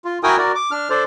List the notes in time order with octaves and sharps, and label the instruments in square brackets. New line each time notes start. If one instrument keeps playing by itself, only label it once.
[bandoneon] F4
E4 F#4 A#4 G5 G#5 D#6
F#4 A#4 D5
D6
D4 F6
D4 A4 C5 D5